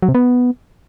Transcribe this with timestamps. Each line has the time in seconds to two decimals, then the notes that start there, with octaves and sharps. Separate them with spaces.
0.02 F#3
0.09 C3
0.15 B3